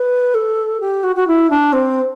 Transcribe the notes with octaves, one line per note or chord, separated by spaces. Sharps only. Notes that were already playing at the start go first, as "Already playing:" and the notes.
Already playing: B4
A4
G4
F#4
F#4
E4
D4
C4